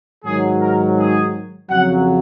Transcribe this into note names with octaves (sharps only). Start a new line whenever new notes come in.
G#2 D#3 F#3 G#4
A#4
G#4
F2 C#3 F#3 F#5